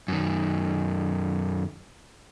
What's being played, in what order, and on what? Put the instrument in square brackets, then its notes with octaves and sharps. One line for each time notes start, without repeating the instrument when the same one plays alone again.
[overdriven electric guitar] F#2 D#3